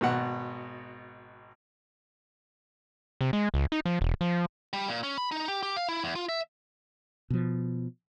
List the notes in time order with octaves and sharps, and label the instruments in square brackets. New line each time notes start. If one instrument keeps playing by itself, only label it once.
[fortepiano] G#1 B2 F#5
[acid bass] C3
G#3
C#2
D#4
F3
E1
F3
[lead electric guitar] G3
A#2
C#4
B5
D#4
G4
G4
F5
E4
E2
F4
E5
[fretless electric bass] B2 F3